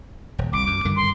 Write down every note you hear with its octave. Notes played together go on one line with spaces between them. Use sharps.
D#1
C2 D6
F#2
G2 D3 D#3
C6